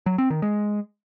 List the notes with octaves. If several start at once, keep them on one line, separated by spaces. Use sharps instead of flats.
F#3
C4
D#3
G#3